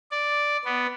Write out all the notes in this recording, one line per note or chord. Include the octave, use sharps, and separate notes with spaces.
D5
B3